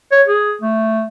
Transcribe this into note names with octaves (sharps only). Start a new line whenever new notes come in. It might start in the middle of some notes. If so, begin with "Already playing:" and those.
C#5
G#4
A3